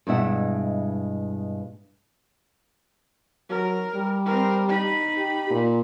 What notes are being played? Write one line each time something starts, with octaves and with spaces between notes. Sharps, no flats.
G2 B2 G#3 E4 E5 F#5
F#3 A#4
G3
C4 A#4
D#4 B5
G4
A#2